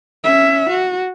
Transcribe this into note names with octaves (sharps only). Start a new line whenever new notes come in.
C#4 E5
F#4